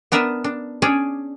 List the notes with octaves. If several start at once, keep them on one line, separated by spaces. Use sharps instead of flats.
B3 D4 A#4 B4 E5
D4
C#4 D4 G#4 C#5 D5